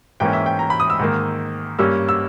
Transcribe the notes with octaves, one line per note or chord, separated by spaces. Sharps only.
G#2 E3 A#3 C#4 G5
E5
G5
A#5
B5
D#6
E6
G#2 D#3 A#3
G2 G3 A#3 C#4 E6
E6